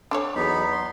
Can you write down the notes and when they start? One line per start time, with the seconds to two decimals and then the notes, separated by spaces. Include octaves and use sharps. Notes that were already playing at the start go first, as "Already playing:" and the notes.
0.11 D4 A4 C#5
0.35 E2 F#3 B3 D#4 B5
0.72 C6